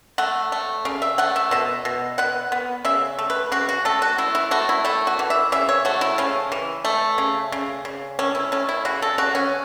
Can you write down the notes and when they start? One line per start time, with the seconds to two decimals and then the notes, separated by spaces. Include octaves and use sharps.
0.18 A3 F#5
0.52 A3
0.85 C#3
1.02 E5
1.18 A3 F#5
1.36 E5
1.51 B2 E5
1.85 B2
2.18 B3 F#5
2.52 B3
2.85 C#3 E5
3.19 A3
3.30 B4
3.52 C#3 F#4
3.69 F#4
3.85 A3 A4
4.02 F#4
4.18 A3 E4
4.35 E4
4.51 A3 F#4
4.69 E4
4.85 A3 E4
5.07 F#4
5.19 E3
5.30 E5
5.52 C#3 E5
5.69 C#5
5.85 A3 F#4
6.01 E4
6.18 C#3 C#4
6.52 E3
6.85 A3
7.18 C#3
7.52 C#3
7.85 C#3
8.19 A3 C#4
8.35 E4
8.52 A3 C#4
8.69 E4
8.85 C#3 F#4
9.02 A4
9.18 C#3 F#4
9.35 C#4